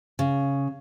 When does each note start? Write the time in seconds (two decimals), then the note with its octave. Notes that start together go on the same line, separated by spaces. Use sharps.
0.19 C#3